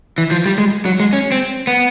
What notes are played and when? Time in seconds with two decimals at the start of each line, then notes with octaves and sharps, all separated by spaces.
0.18 E3
0.31 F3
0.46 G3
0.58 G#3
0.85 F#3
1.00 G#3
1.13 C#4
1.32 C4
1.67 B3